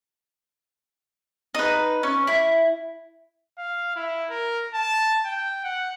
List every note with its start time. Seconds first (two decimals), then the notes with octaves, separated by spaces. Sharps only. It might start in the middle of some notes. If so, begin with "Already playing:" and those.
1.55 D#4 B4
2.03 C#4
2.27 E4
3.58 F5
3.96 E4
4.30 A#4
4.74 A5
5.25 G5
5.64 F#5